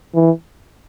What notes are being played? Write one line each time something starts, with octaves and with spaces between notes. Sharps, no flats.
E3